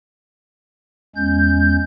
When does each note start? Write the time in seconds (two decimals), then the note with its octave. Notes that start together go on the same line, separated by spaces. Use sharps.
1.16 E2 G#3 C#4 G6